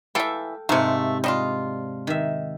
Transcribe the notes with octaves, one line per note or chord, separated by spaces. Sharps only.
E3 A4 E5 F5 G5
G#2 C3 A3 A#3
G3 D4 F4 D#5
D#3 E5